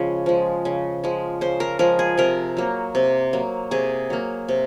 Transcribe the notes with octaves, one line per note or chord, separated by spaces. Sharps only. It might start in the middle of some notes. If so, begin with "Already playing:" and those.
Already playing: C#3 F3 G#3
F3 G#3
C#3
F3 G#3
C#3 C5
A#4
F3 G#3 A#4
G#4
C3 A#4
F#3 A#3
C3
F#3 A#3
C3 G#4
F#3 A#3
C3